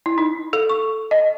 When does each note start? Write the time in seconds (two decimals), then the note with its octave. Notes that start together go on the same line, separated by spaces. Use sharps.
0.06 E4
0.18 D#4
0.53 A4
0.70 C#6
1.11 D#5